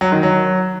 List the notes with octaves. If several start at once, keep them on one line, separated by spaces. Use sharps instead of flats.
F#3
D#3
F#3